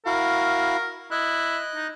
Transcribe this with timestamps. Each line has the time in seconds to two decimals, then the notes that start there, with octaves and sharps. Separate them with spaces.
0.06 E4 F#4 A#4 F5
1.11 E4 D#5 F#6
1.75 D#4